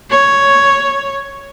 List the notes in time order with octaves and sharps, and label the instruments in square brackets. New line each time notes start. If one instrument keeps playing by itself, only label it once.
[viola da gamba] C#5